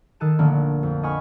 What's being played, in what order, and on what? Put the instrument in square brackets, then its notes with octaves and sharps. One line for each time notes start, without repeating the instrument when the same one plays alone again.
[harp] D#3 A4 F#6 D#7 E7
A#1 D3 A3 A#3
F2
D#5 F#5 G#5 B5 C#6 F6